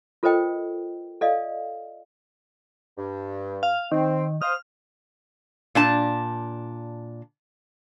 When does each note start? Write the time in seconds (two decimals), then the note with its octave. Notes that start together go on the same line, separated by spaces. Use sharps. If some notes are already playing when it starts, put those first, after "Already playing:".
0.23 F4 A4 A#4 C5 D#5 G5
1.21 A4 D5 D#5 F5
2.98 G2
3.63 F5
3.92 D#3 C4
4.42 C5 F5 D#6 F6
5.75 A#2 D4 A5